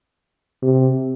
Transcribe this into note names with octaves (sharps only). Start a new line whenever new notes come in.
C3